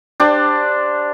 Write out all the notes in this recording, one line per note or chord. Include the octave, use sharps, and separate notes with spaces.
D4 G4 C5